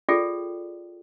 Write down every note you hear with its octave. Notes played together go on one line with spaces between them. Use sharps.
F4 G#4 A4 D5 G5